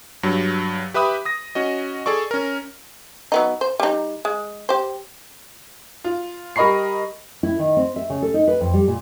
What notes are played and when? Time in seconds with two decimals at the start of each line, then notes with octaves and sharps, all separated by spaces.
0.23 G2 F#3
0.94 G4 B4 E5 B5 D#6
1.25 D#6 A#6
1.55 C#4 F#4 D#5
2.06 G#4 A4 D5 C#6
2.31 C#4 A#4
3.32 F#3 B3 D#4
3.61 C5
3.80 G3 D#4
4.25 G#3
4.69 G4 C5
6.04 F4
6.56 G3 A#4 D#5 B5 C#6 C7
7.43 E4
7.59 D#3
7.77 C4
7.96 E5
8.10 C#3
8.22 A4
8.34 D#4
8.48 B4
8.61 F2
8.73 G3
8.88 A#2